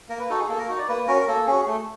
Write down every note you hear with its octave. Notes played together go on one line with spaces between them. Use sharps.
A#3 A#4
B4
D#4 F#4 A4
G#4
A#3 A4
A#4
D#4 F#4
D5
A#3 B4
C#4 F#4 A#4
A#3 A4
C#4 F#4 G#4
A3